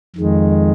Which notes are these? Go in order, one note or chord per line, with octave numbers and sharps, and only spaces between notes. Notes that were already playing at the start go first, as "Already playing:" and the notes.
F2 D#3 G#3